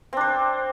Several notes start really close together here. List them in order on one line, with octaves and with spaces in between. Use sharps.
C4 D4 C5